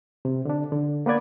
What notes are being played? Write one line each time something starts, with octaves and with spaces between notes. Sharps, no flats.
C3
D3 D4
D3
A#3 B3 B4 D5 G#6